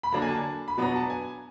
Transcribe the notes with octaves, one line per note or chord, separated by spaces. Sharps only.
B5
D3 F#3 A#3 D4 A#5
G#5
A5
B5
B2 F#3 B3 D4 A#5
A5
G#5